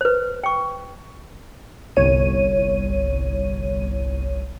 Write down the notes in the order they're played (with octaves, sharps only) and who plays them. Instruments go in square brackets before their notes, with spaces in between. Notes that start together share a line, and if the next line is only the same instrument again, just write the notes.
[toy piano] B4 C5
G5 C#6
[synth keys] G1 C2 C#5 D#7